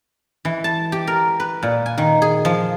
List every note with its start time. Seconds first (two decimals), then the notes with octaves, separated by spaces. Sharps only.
0.45 E3
0.64 A5
0.92 G4
1.07 A#4
1.40 B4
1.63 A#2
1.86 G#5
1.98 D#3
2.22 G#4
2.45 F3